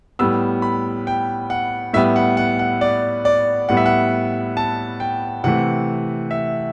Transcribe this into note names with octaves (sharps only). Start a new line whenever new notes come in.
A2 G3 B3 E6
B5
G5
F#5
A2 G3 B3 E5
F#5
F#5
F#5
D5
D5
A2 G3 B3 F#5
E5
F#5
A5
G5
C3 E3 A3 F#5
E5